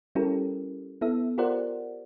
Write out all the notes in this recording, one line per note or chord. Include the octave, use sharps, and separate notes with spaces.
G3 C#4 E4 G4 A4 A#4
B3 E4 A4 E5
F4 G4 A#4 C5 D5 F#5